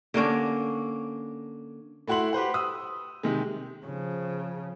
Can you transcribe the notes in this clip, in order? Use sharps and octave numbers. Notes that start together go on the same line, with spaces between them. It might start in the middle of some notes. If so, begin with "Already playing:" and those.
D3 A#3 C#4 D4
A3 E4 F#4 F#5 C6 F#7
G4 B4 C5 F#5
D#6 E6
C3 D#3 G#3
C#3 F3